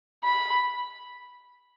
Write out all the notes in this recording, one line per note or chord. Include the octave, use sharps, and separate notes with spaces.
B5